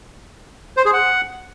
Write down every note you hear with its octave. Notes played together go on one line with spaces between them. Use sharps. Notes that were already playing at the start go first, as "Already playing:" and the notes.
C5
G#4
F#5